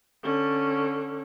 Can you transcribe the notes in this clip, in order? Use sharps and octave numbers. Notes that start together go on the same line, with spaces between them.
D3 C#4